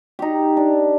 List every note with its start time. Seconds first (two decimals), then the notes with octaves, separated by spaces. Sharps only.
0.19 D#4 G4
0.57 D4